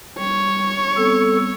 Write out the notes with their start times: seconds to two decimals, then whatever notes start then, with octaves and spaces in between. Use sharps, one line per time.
0.19 G3 C#5
0.97 G3 B3 C4 A4